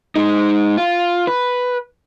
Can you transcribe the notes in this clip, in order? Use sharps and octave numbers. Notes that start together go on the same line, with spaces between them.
G#3 D#4
F4
B4